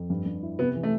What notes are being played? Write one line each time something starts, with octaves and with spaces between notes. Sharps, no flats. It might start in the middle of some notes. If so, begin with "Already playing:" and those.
Already playing: F2
G2
G2
E4
C3 B3
E3
A3